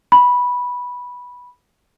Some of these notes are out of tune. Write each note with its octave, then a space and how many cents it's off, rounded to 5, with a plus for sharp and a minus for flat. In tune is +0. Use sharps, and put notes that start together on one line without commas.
B5 -10